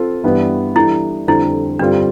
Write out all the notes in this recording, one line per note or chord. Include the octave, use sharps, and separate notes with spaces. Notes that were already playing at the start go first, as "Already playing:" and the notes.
Already playing: C4 F4 A4
G2 E3 G3 B3
E3 G3 D4 E4 A4
F2 D3 G3 C4 E4
G2 D3 G3 C4 D4 F4